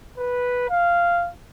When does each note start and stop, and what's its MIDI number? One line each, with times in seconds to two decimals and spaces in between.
0.18 0.67 71
0.70 1.29 77